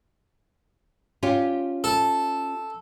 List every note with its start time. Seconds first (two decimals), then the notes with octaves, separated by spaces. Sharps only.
1.23 C#4 F4 G4
1.84 A4